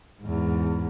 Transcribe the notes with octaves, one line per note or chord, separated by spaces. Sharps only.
E2 G#2